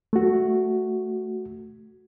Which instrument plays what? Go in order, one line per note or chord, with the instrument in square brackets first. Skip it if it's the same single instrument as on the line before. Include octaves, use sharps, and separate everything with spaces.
[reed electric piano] A3 F#4